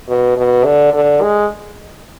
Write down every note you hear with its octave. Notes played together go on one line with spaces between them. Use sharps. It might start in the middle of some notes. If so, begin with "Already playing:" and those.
B2
B2
D3
D3
G#3